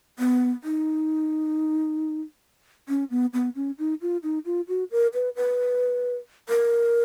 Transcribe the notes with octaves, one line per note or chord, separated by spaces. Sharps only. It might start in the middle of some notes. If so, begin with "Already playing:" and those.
B3
D#4
C#4
B3
B3
C#4
D#4
F4
D#4
F4
F#4
A#4
B4
B4
A#4